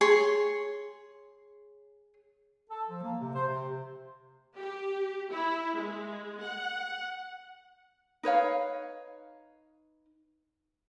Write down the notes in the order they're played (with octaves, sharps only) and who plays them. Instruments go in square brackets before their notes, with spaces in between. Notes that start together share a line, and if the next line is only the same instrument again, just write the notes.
[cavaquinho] G#4 C#5 C6
[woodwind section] A4
F3
A#3
C3
C5
C3
[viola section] G4
E4
G#3
F#5
[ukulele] D#4 B4 C#5 F5